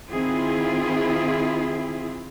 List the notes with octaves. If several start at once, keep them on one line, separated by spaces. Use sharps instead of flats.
D#3 C4 E4 F4 G#4